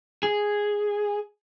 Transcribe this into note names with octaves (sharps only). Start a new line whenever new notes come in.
G#4